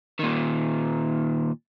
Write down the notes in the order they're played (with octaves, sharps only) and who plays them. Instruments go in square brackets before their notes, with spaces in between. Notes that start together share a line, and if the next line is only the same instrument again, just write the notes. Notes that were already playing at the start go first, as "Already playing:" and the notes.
[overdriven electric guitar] A#2 D#3